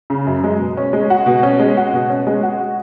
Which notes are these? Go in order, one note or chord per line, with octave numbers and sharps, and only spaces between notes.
C#3
F#2
G#3
B2
C#4
G#3
F#4
B2
C#4
G#3
F#4
B2
C#4
G#3
F#4